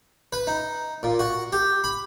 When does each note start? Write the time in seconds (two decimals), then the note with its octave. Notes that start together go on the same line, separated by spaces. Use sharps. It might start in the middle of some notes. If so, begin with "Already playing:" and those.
0.32 B4
0.47 D#4
1.03 A#2
1.19 F#4
1.52 G4
1.84 B5